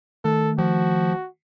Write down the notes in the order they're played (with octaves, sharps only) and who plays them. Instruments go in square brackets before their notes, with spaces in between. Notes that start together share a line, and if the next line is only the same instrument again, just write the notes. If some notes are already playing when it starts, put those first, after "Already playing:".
[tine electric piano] D#3 A3 [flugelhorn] A4
[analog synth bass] F3 [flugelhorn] F#4